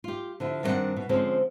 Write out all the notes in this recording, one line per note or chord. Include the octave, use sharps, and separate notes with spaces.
F4 G4
D3 F3 E4
G2 D#3 G#3 C4 D4 F#5
B2
D3 F3 G#3 C4 C#4